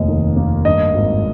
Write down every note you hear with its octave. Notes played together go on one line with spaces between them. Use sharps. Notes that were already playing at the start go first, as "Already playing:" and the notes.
Already playing: F1 D#2 D#5
D#3
A#3
G2 D#5
G#1